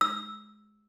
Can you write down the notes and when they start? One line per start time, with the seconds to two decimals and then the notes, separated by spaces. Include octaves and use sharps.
0.01 E6